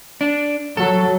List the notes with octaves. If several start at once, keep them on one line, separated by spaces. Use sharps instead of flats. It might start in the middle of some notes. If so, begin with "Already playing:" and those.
D4
F#3 A4